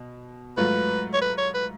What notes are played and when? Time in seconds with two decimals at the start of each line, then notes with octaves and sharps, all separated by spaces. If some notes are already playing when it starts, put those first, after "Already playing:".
Already playing: B2
0.57 G#2 F#3 A3 F4 B4
1.14 C#5
1.21 B4
1.38 C#5
1.54 B4